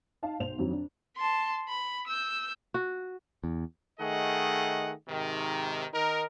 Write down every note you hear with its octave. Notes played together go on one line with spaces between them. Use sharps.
D#4 F5 A5
B1 C5 F7
F2 D3 D#3 F#3
D4
A5 C6
B5
E6 G6
F#4
E2
D#3 A3 G#4 D#5 F#5
G#2 C3 D#3
D#3 D#4 A#4